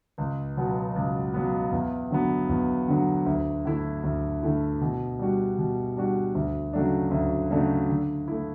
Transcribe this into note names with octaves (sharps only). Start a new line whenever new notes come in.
C#2
B2 F#3 B3
C#2
B2 F#3 B3
E2
D3 F#3 B3
E2
D3 F#3 B3
D2
D3 A3 E4
D2
D3 A3 E4
B2
G3 D4 F#4
B2
G3 D4 F#4
D2
C#3 F#3 A3 D4
D2
C#3 F#3 A3 D4
D3
A3 E4